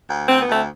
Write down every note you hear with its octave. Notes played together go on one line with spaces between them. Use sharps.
D2
D2 C4
B3
D2 A3 C4